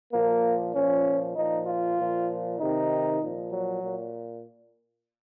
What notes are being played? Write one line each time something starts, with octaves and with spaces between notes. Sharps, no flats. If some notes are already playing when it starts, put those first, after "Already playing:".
A#2 F3 A#3
A#2 F3 C#4
A#2 F3 D#4
F4
A#2 F3
C3 D#3 D#4
A#2 F3
F#3
A#2